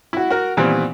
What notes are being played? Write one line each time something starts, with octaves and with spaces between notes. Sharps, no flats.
E4 F#4
F#4 A#4
A#2 D#3 E3 G3 B3 C4